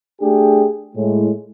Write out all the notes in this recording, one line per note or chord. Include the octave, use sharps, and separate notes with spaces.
A3 D4 G4 G#4
A2 G#3